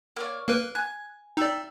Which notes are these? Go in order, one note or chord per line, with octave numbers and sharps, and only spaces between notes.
A#3 C#5 D5
A#3 A#4 B4 F#6
G#5 F#6
D#4 D5 E5 G5